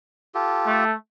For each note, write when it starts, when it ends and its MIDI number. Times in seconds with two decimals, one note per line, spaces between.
0.35 0.84 65
0.35 0.84 67
0.35 0.84 69
0.66 0.95 57